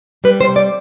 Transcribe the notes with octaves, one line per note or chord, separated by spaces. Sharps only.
G3 B4
C5
C3
D5